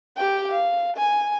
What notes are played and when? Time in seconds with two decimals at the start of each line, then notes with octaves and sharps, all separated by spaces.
0.17 G4 G5
0.52 F5
0.97 G#5